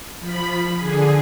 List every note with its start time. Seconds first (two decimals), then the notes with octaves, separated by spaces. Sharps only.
0.20 F3 B5
0.76 D3 G#4